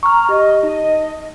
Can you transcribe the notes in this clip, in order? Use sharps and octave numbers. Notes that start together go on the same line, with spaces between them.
A#5 C#6 F6
G4 D#5
D#4 D#5